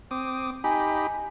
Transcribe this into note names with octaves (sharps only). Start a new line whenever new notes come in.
C4 D6 D#6
D#4 G4 G#5 B5